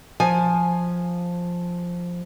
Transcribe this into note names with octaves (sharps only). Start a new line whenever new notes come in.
F3 G#5